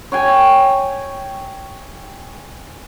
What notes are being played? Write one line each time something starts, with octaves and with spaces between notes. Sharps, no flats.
C#5 G5 G#5